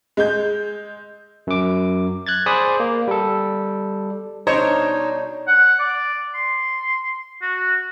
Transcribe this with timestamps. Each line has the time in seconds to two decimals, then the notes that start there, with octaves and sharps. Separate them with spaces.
0.17 G#3 G6
1.47 F#2 D6
2.27 F#6 G#6 A6
2.46 G#4 C5 D5 B5 D#6
2.80 A#3
3.08 G3 A4
4.47 B2 G3 D4 D#4 C5 C#5 D#5 A#5
5.48 F#5
5.80 D5
6.35 C6
7.42 F#4